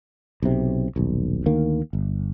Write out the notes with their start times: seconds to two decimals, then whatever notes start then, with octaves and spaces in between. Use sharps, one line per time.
0.42 B1 C3
0.96 D#1 B1
1.46 D2 D#3 A#3
1.93 G1